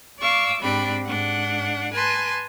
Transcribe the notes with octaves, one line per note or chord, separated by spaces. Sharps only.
D5 F5 C#6 D6 E6
G#2 G3 C4 D4 B5
G#2 D4 F#5
B4 G#5 A5 C6